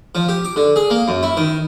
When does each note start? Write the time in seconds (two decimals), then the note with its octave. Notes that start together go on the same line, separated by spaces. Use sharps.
0.15 F3
0.29 G4
0.45 D6
0.56 D3
0.76 G#4
0.90 A#3
1.08 F#2
1.23 E4
1.37 D#3